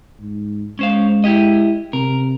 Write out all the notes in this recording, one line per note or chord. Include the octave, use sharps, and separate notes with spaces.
G#2
G#3 C#4 C5 F5
E4 G4 D#5
C3 A#4